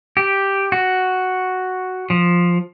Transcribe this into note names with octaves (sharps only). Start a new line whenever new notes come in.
G4
F#4
F3